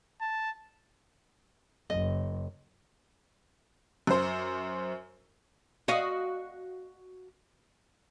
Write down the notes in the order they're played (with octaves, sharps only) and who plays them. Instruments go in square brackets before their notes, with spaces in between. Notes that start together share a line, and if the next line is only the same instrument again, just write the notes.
[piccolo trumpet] A5
[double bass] F#1 [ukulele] D#5
[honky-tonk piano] F#2 C5
[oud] F#4 D#5 F5